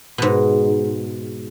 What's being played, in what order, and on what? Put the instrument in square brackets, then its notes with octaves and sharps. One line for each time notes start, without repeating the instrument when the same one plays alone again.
[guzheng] G#2 B2